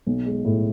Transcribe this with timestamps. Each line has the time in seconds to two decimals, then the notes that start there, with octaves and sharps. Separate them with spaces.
0.07 B1
0.26 G#3
0.45 A2